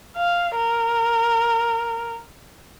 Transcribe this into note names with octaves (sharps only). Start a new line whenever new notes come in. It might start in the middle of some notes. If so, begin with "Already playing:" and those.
F5
A#4